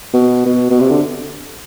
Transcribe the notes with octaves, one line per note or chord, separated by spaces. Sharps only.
B2
B2
B2
C3
D3